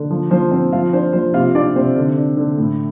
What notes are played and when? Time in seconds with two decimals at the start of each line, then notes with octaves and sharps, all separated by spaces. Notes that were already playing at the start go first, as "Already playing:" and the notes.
Already playing: D3
0.10 F3
0.31 F3 C5
0.51 C4 C5
0.72 F3 F4 F5
0.93 D4 C5
1.13 F3 C5
1.34 C3 F4 F5
1.55 C4 D4 D5
1.76 C3 C5
1.96 D3
2.17 D4
2.37 D3
2.58 A2